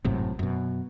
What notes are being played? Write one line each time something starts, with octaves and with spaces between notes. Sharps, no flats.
G#1 F#2 A2 C3
F#2 B2